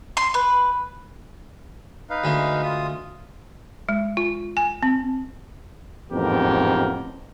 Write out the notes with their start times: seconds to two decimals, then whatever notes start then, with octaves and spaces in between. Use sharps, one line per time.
0.17 C6
0.34 B4
2.10 D#4 B4 F5
2.24 D2 G#3
2.63 F4 D#6
3.89 G#3
4.17 F4
4.57 G#5
4.83 C4
6.12 A1 F2 G#2 B3 G4 A#4